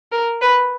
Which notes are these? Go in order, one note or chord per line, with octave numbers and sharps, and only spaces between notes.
A#4
B4